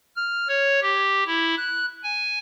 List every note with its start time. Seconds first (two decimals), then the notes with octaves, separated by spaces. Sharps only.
0.16 F6
0.48 C#5
0.82 G4
1.26 E4
1.57 F#6
2.03 G#5